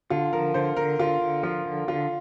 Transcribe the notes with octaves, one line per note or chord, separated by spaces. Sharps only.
D3 F4
F3 A#4
D3 C5
D3 A#4
D3 F4
D3
F3 F4
D3
D3 F4